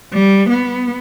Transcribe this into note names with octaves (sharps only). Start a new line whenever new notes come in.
G3
B3